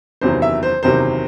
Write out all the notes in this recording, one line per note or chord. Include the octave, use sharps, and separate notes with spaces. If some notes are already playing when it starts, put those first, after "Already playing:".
F#1 E2 C3 D#3 F#3 C5
E5
C5
F#1 E2 C3 D#3 F#3 C5